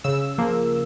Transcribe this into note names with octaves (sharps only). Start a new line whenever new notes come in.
C#3 E6
F3 A#3